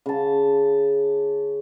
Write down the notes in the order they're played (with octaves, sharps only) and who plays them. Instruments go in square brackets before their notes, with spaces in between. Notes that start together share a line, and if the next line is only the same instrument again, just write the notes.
[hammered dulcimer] C#3 A5